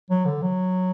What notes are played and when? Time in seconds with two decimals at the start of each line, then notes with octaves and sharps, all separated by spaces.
0.10 F#3
0.25 D3
0.42 F#3